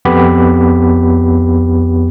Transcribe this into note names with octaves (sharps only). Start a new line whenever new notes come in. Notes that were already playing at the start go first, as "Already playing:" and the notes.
F2 B3 G4 B5